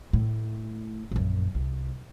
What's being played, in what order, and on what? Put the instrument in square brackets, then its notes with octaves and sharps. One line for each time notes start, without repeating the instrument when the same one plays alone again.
[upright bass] A2
A#1 F#2
C2